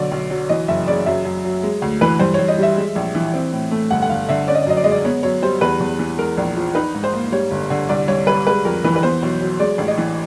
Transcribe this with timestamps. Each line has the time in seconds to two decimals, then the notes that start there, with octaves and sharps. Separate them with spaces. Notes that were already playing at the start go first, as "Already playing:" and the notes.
Already playing: B1 D3 D5
0.12 B1
0.30 F#3
0.49 E3 D#5
0.68 F#1 E5
0.87 C#3 D5
1.06 F#2 E5
1.25 F#2
1.44 F#3
1.63 G#3
1.82 D2
2.01 E3 B4
2.20 G2 C5
2.34 C#5
2.39 G2
2.48 D#5
2.58 G3 E5
2.77 G#3
2.96 A#1
3.15 E3
3.34 C4
3.53 A2
3.71 A3
3.91 G1 F#5
4.02 F#5
4.09 G1 F5
4.29 D3 E5
4.48 C#4 D5
4.55 D#5
4.62 D5
4.66 F#2 D#5
4.77 D5
4.84 G#3 D#5
4.92 D5
5.05 B3 C#5
5.23 F#2 C#5
5.42 G3 C5
5.61 E2 B4
5.80 E2
5.99 E3
6.18 G#3 A#4
6.37 A#1
6.57 F3
6.75 D#4 B4
6.95 G#2
7.04 C5
7.14 A#3
7.32 G3 C#5
7.51 G1
7.70 D3
7.89 C2 D5
8.08 C2 C#5
8.26 G3 B4
8.47 G#3 B4
8.65 F2 A#4
8.84 E3 B4
8.96 B4
9.03 B3 C5
9.22 B1
9.41 F#3
9.60 G#3 D5
9.78 A1
9.88 D#5
9.98 E3